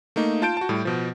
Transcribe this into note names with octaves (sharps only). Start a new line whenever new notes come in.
A3 A#3 D#4
F4 A5 G6 D7
F#4 A5
A2 G3
B2 F3